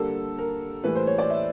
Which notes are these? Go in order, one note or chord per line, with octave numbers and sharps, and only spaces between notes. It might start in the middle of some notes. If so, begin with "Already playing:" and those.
Already playing: D3 G3 A#3 A4
A#4
A2 E3 G3 A#3 B4
C5
C#5
D5
E5